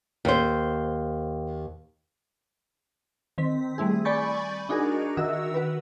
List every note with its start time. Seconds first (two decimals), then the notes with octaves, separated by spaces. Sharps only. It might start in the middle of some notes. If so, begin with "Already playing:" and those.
0.25 D#2 C5
3.38 D#3 C4 B6
3.78 G3 A3 C4 E4 G#4
4.05 D5 G#5 B5 C#6 G6 A6
4.69 D4 D#4 F#4 G#4 A#4
5.17 D#3 F#4 A#4 E5 E6
5.54 F#4 B4